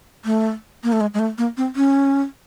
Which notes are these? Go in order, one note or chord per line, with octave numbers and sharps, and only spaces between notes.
A3
A#3
A3
G#3
G#3
A3
A#3
C4
C#4